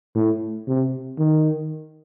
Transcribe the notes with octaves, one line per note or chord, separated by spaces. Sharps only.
A2
C3
D#3